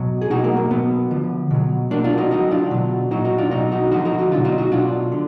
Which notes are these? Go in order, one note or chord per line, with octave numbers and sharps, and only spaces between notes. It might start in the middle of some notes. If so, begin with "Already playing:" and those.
Already playing: B2 F#3
G#4
B2 F#3 D#4 F#4
A#3
A#3
B2 F#3 B3
D3 F3
B2 F#3
B2 F#3 A#3 D4
D4 F4
D#4 F#4
D3 F#3 D#4 F#4
D4 F4
B2 F#3
A#2 F#3 D#4 F#4
D#4 F#4
D4 F4
B2 F#3 D#4 F#4
D#4 F#4
D3 F3 D#4 F#4
D#4 F#4
D#4 F#4
B2 F#3 D4 F4
D#4 F#4
D#4 F#4
B2 F#3 D4 F4
D3